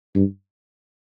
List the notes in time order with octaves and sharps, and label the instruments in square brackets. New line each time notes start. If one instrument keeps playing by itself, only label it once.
[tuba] G2